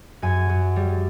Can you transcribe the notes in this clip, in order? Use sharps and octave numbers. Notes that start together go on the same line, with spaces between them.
F#2 G#5
F#2
G3